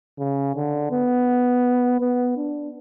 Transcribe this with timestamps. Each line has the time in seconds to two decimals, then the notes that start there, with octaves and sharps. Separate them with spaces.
0.19 C#3
0.55 D3
0.91 B3
2.01 B3
2.37 D4